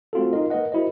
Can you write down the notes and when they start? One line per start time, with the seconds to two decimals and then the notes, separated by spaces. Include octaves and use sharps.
0.13 A3 C4 F4 F#4 A4
0.33 D#4 F4 A#4 D#5
0.50 A#3 A#4 B4 D#5 F#5
0.72 E4 F#4 A#4 C5 D#5